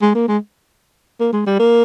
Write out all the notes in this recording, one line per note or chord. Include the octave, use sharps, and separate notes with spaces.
G#3
A#3
G#3
A#3
G#3
G3
A#3